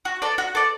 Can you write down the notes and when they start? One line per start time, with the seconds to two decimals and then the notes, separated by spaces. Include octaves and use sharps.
0.05 F#4
0.22 A4 D5
0.38 F#4
0.55 A4 D5